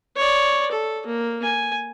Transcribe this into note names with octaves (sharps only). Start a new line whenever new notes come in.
C#5 D5
A4
A#3
G#5